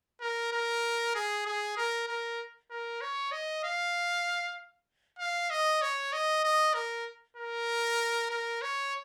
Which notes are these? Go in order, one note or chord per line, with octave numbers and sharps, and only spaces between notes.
A#4
A#4
G#4
G#4
A#4
A#4
A#4
C#5
D#5
F5
F5
D#5
C#5
D#5
D#5
A#4
A#4
A#4
C#5